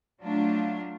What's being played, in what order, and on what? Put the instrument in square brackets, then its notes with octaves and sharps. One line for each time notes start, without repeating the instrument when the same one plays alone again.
[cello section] F#3 A3 D4 F4